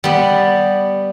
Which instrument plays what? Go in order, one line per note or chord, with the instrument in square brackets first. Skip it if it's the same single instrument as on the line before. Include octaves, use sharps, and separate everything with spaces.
[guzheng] G3 B3